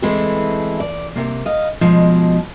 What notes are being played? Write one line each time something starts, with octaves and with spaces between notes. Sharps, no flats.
E3 G#3 A3 C4 E4
D5
C3 A#3
D#5 F5
B2 F3 G#3